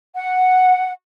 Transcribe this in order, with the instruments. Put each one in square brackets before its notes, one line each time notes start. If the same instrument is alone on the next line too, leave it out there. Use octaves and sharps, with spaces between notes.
[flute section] F#5